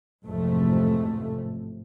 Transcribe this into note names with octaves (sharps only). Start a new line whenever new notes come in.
A1 F2 G#2 C3 F3 A3